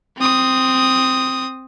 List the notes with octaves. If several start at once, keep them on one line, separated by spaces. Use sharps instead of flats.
C4 D#6